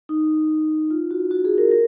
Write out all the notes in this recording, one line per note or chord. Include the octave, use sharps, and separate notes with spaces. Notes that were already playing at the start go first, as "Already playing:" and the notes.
D#4
F4
F#4
F#4
G#4
A#4
A#4